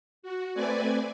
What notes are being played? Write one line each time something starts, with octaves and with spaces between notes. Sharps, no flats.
F#4
A3 C4 B4 D5 G#5